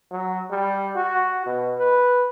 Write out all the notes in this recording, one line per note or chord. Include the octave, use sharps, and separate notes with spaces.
F#3
G3
F#4
B2
B4